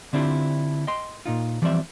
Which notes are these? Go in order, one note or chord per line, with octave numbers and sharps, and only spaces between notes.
D3 C4 D4 E4 F4 G4
D#5 G5 C6
A#2 D#4 F4
E3 F3 G3 C4 D5 E5